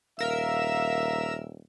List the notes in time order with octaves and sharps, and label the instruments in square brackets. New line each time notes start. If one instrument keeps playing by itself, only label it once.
[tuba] D#1 [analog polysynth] A#4 E6 [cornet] E5 [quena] F5